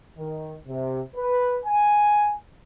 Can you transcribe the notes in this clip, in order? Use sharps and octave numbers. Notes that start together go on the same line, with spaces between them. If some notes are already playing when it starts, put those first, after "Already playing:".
D#3
C3
B4
G#5